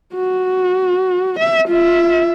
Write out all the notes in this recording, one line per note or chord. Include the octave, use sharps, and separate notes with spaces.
F#4
E5
F4 E5